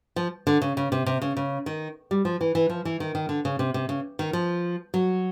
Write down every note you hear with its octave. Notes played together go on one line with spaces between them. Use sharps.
F3
D3
C#3
C#3
C3
C3
C#3
C#3
D#3
G3
F3
E3
E3
F3
E3
D#3
D#3
D3
C#3
C3
C3
C#3
D#3
F3
F#3